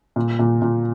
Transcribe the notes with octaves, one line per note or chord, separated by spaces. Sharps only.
A#2
A#2
A#2